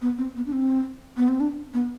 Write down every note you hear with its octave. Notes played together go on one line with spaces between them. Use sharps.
B3
C4
B3
D4
C4
B3
C4
D4
B3